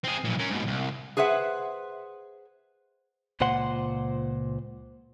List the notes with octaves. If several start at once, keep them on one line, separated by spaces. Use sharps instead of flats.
C4 G#4
B1 A#2
C#4 A#4
G#2 B2
C2
G#4 B4 C5 E5 F#5
C#2 A#2 C5 F#5 C6